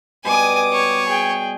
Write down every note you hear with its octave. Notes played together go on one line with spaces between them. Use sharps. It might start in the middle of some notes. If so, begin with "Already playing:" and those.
B2 G3 G4 G#5 D6 D#6
C#5
G#4 G5